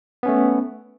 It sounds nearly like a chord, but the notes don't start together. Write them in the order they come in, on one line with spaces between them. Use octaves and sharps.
B3 C#4 A3